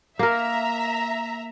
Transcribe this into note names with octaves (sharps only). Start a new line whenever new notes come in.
A#3 A#4 E5 A#5